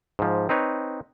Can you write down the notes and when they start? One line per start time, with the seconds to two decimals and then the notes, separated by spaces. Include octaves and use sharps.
0.19 G#2 F3
0.49 C4 D#4 B4 C#5